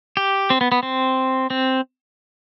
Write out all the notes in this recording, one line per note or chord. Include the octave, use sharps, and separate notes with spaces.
G4
C4
B3
B3
C4
C4